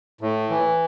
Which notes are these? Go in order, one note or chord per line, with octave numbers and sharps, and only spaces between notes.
A2
E3